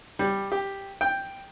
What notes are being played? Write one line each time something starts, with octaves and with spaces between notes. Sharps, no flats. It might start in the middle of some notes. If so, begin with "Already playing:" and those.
G3
G4
G5